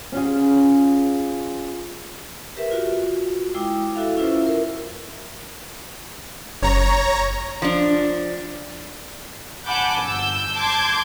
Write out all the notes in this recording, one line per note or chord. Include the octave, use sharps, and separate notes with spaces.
C#4 F4 G#4
G4 A#4 B4 E5
F4 F#4
G#3 E4 G5 D6 D#6
E4 F#4 A4 E5 F5
C#4 E4 F4 B4 C5 E5
A#4
F#1 C#5 A#5
F3 D4
F#5 G#5 A5 B5 D6 G6
G1 E6 G6
A5 C6 D6 G6 G#6